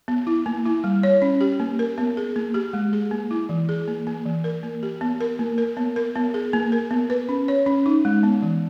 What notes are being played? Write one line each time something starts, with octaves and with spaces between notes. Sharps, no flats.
B3
E4
A#3
E4
G3
C#5
C#4
G4
A#3
A#4
B3
G#4
A#3
G4
G#3
G#4
A#3
E4
E3
G#4
A#3
A#3
E3
A#4
A#3
G4
B3
A#4
A#3
A#4
B3
A#4
B3
G#4
A#3
A#4
B3
B4
C#4
C#5
C#4
D#4
G#3
B3
E3